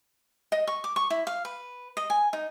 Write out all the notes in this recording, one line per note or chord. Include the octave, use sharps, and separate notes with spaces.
D#5
C#6
D6
C#6
E4
F5
B4
D#5
G#5
D#4